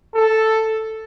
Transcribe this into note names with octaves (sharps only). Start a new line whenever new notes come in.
A4